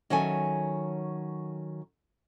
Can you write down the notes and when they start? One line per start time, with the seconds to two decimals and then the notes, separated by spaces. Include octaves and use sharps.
0.10 D#3 F#3 C#4 A4 E5 G#5